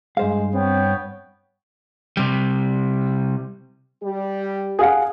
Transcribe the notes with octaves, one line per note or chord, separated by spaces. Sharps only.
G2 G#3 C5 F5
B3 C4 C#5 G5
C3 G3
G3 G4
G#4 F5 F#5